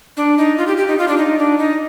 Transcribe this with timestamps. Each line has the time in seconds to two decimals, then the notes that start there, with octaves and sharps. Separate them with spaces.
0.17 D4
0.38 D#4
0.57 F4
0.67 G4
0.77 G4
0.88 D#4
0.98 F4
1.08 D4
1.17 D#4
1.38 D4
1.58 D#4